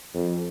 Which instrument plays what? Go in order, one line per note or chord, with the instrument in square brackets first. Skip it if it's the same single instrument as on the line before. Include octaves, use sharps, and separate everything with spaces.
[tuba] F2